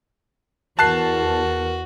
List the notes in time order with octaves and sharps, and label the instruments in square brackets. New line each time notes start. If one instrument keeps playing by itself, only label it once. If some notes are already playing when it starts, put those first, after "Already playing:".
[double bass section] E2 [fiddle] F#4 [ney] A#4 [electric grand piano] A5 F#6 C7